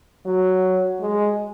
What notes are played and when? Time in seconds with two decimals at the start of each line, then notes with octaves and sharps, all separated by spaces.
0.25 F#3
1.00 G#3